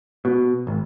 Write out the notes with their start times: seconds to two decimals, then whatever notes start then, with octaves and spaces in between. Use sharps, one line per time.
0.25 B2
0.67 G#1